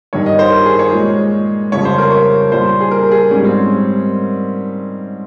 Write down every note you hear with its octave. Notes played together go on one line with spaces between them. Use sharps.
G2 D#3 G3 C#5
D#5
C5
A#4
G#4
C#5
A#2 G#3
F2 C#3 G3 C#5
C5
A#4
C#5
A#2 G3 C5
G#4
A#4
G#4
G#2 G3 C#4
C4